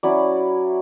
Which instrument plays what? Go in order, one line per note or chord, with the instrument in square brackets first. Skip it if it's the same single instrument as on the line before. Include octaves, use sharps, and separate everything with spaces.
[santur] F#3 C#4 E4 D5